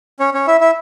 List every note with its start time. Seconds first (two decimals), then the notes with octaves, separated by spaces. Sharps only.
0.19 C#4 C#5
0.34 C#4 C#5
0.47 E4 E5
0.61 E4 E5